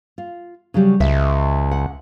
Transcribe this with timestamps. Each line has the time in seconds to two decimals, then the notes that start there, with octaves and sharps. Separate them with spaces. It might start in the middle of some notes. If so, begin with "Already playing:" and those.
0.18 F4
0.74 C#3 F#3 G3
1.00 C#2 E5
1.71 F#5